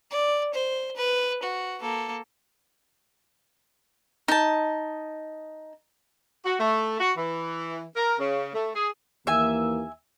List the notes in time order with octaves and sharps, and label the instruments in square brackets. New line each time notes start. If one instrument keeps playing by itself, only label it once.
[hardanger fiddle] D5
C5
B4
F#4
A#3 A4
[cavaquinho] D#4 A5
[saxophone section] F#4
A3
F#4
E3
A#4
C#3
A3
G#4
[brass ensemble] D#2 E3 A#3 [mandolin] E5 G#5